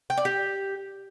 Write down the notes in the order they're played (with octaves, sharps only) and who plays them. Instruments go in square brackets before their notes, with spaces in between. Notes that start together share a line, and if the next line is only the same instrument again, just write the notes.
[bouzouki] G5
D5
G4